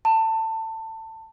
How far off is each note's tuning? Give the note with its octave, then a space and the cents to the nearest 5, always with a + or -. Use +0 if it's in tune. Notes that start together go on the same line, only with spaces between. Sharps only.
A5 +25